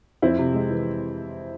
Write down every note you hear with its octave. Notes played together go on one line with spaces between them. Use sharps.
F2 C4 E4
C3
G#3
E3